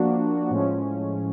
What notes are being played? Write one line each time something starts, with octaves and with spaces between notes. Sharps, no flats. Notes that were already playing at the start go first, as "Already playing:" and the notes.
Already playing: F3 A#3 D4 F#4
A2 F3 G#3 C#4